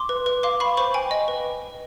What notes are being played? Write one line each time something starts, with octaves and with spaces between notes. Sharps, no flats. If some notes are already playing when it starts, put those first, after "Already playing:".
Already playing: C6 D6
B4
B4
F5 C6 D6
F5 B5 C#6
C5 B5 C#6
G5 G#5
D#5
B4